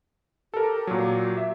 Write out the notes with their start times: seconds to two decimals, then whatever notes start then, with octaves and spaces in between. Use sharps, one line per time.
0.54 G4 A4 A#4
0.87 A#2 F#3
1.37 E5